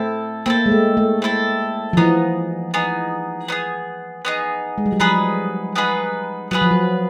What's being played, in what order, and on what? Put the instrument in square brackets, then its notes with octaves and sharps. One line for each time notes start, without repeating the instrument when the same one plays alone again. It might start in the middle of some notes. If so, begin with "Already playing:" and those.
Already playing: [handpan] A3 [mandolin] C4 E4 A4
[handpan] A#3 [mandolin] C4 E4 A4
[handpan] G#3
A3
A3
[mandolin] C4 E4 A4
[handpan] F3
[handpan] E3 [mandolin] B3 D#4 G#4
[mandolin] B3 D#4 G#4
B3 D#4 G#4
B3 D#4 G#4
[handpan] G#3
G3
F#3
[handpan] F3 [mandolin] B3 D#4 G#4 B4
[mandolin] B3 D#4 G#4 B4
[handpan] F#3 [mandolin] B3 D#4 G#4 B4
[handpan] F3
F#3